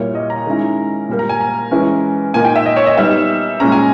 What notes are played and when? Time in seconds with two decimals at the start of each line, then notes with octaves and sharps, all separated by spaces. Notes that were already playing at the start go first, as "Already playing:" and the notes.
Already playing: A#2 G3 A#3 E4 C#5
0.15 D#5
0.30 A#5
0.45 D#3 G#3 C#4 E4
1.09 A#2 G3 A#3
1.19 A#5
1.29 G#5
1.41 A#5
1.71 E3 G#3 C#4 E4
2.34 A#2 A#3 D#4 G#5
2.45 G5
2.56 E5
2.66 D#5
2.76 C#5
2.86 D#5
2.97 G3 B3 D#4 E5
3.60 A#2 G#3 C#4 A#5
3.72 G#5